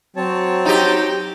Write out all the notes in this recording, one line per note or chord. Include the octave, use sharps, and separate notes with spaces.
F#3 C4 C#5 A5
D#4 G4